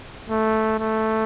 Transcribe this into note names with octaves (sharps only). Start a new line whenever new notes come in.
A3
A3